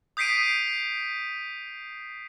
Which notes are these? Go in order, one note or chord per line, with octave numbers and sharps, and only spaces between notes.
D#6 G6 B6 C7 D7 D#7